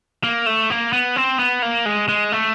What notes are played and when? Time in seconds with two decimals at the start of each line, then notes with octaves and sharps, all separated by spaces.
0.23 A#3
0.46 A3
0.70 A#3
0.93 B3
1.16 C4
1.39 B3
1.62 A#3
1.86 G#3
2.09 G#3
2.32 A3